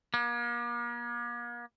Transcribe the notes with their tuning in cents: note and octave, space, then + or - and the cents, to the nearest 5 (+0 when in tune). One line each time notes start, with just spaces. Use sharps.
A#3 +40